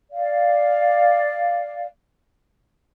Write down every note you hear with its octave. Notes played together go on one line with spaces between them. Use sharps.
D5 F5